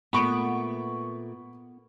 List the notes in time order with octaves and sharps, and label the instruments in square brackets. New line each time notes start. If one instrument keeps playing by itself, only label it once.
[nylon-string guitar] A#2 A3 [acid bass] B3 [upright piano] B5 C#6 D7